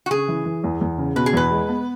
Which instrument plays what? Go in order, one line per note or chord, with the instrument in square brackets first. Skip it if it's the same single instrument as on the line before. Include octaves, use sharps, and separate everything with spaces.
[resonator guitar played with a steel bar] F#4
[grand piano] C#3 [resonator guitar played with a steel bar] G#4
[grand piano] E3
E3
E2
E2
C#3
[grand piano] B2 [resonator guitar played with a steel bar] B4
[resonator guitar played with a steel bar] G#4
[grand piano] E2 [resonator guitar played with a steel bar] B4
[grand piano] G#3
B3